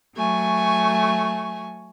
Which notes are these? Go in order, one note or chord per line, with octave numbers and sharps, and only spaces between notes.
F#3 A3 G#5 C#6